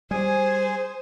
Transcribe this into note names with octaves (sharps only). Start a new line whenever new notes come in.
G3 G#4 C5 G#5